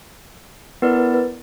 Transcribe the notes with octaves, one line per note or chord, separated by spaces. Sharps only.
B3 E4 A#4 B4 D5
B4
B4